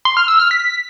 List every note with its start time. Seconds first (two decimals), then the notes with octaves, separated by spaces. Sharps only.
0.05 C6
0.17 F6
0.28 E6
0.39 F6
0.51 B6